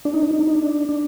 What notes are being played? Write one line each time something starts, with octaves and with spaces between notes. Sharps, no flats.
D4
D#4
D4
D#4
D4
D#4
D4
D4